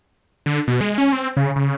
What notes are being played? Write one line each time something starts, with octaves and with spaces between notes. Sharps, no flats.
D3
B2
G#3
C#4
C4
C#3
C#3